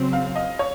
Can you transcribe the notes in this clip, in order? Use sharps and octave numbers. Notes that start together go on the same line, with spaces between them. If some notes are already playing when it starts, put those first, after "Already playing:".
Already playing: C#3 F#3 C4
F5
D#5
C#5